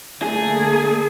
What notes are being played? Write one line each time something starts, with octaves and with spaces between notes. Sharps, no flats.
D3 A3 A#3 G#4